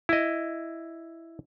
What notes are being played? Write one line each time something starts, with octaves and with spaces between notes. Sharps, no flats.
E4 D#5